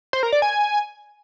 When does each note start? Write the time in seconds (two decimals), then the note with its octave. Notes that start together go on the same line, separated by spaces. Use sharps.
0.13 C5
0.23 A#4
0.32 D5
0.42 G#5